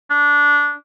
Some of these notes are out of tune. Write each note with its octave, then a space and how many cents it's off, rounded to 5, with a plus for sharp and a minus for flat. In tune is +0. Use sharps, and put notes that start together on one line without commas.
D4 -15